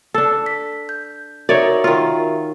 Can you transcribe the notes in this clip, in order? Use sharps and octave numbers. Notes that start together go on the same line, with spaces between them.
D4 A4
B6
G6
D#4 F#4 A#4 C#5 D5 E5
D#3 F4